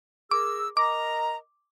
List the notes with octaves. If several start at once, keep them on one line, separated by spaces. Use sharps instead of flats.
G#4 A#4 D6 E6
A#4 D#5 A#5 D6